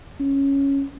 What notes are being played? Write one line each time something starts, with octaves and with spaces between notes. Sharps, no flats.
C#4